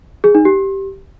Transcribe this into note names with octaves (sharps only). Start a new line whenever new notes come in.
G#4
D#4
G4